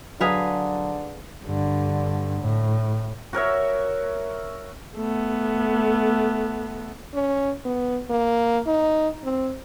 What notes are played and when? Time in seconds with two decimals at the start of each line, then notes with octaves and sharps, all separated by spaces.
0.21 D3 F#3 G#4 B4 F5 A#5
1.44 G2 D3
2.41 A2
3.33 F#4 A#4 C#5 E5
4.97 A3 B3
7.14 C#4
7.65 B3
8.10 A#3
8.66 D#4
9.24 C4